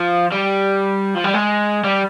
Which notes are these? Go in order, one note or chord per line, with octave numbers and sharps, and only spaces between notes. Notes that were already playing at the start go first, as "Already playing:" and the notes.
Already playing: F3
G3
F3
G3
G#3
G3